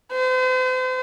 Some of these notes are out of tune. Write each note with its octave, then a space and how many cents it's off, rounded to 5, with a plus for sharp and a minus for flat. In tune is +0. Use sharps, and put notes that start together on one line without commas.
C5 -40